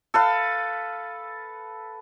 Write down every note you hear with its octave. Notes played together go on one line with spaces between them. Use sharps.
A4 B4 F5